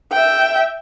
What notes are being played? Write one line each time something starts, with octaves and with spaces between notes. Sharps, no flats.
E5 G5